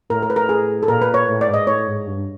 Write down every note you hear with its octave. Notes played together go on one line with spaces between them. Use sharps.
A2 A#4
A#4
B4
A#4
G#4
A4
A#2 A#4
B4
C#5
A2
D5
G#2
D#5
A2 C#5
G#2
G2